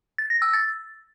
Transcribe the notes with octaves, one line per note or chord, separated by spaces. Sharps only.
A6
A#6
E6
A6